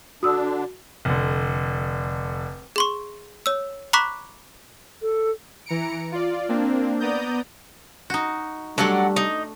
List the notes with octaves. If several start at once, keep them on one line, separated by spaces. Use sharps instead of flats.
D3 D4 F#4 D#6 E6
F1 D3
G#4 C6 C#6
C#5 E6
A#5 B5 C#6 D6 F#6 B6
A4
E3 A#5 C#7 D7
F4 D5
A#3 C4 D4
B3 D5 A#5 D#6 G6
D#4 F#4
F#3 G3 A3 D4 D5 F#5
D#4